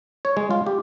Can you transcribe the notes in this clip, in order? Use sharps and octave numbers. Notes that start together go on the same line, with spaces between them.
C#5
G#3
F4
G4